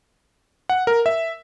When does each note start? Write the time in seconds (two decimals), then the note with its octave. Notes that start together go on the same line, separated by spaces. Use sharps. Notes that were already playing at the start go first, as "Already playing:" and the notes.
0.69 F#5
0.87 A#4
1.06 E5